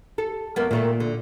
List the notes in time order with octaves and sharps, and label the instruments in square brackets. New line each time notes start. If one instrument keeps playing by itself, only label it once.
[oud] A4
F#2 A#3 B3
[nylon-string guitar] A#2 [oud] D#3 A3 A#3
[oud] D3